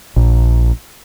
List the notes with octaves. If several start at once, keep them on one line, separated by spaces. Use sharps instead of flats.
A#1